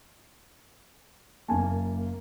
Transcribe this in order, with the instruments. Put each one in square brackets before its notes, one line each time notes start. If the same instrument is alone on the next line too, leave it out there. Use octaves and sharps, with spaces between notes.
[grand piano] F#1 G#5 A5 [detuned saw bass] A#3